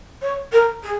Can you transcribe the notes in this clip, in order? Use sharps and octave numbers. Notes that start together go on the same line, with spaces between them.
C#5
A#4
G#4